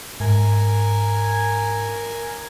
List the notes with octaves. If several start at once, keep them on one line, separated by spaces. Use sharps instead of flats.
G#2 A#4 G#5